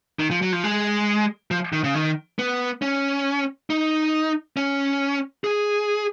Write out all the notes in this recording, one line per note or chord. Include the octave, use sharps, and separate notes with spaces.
D#3
F3
F#3
F3
G#3
F3
D#3
C#3
D#3
B3
C#4
D#4
C#4
G#4